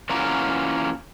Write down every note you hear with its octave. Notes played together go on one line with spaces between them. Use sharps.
E3 A#3 C#4 F4 F#4 A#4